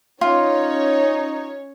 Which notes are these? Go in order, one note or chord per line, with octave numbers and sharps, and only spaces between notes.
C#4 D#4 F4 C#5